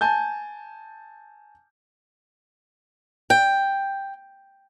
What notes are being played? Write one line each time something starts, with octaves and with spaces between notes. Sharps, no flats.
G#5 A5 G6
G5